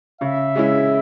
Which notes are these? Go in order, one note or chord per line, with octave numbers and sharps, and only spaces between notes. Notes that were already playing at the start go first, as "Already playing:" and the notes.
C#3 E5
G#3 C#4 E4